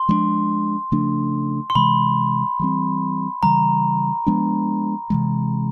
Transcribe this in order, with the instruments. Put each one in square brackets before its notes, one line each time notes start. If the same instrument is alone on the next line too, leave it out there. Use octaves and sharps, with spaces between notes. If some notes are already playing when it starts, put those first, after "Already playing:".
Already playing: [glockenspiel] C6
[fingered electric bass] F3 G#3 B3 D4
C#3 F3 A3 D4
[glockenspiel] C6
[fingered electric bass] C3 E3 G#3 [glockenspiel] B5
[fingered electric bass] E3 G3 C4
[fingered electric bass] C#3 E3 G3 [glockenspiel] A#5
[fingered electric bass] F3 G#3 B3 D4
C3 E3 G#3